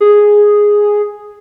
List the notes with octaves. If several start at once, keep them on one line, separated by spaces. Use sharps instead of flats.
G#4